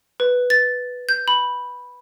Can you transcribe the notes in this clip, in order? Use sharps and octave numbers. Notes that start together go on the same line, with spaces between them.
B4
A6
G6
B5